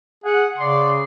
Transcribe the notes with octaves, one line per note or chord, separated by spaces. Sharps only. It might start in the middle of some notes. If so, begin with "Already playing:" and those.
G#4 F#5
C#3 D5 C6